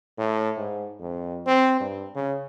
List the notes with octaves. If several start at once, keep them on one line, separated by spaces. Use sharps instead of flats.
A2
G#2
F2
C4
G2
C#3